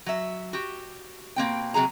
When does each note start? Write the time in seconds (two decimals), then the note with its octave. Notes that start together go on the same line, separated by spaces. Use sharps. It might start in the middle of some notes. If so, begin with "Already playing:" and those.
0.06 F#3 E5
0.53 F#4 G4
1.36 B2 A#3 C4 G5
1.74 C3 F#3 G#4 A#5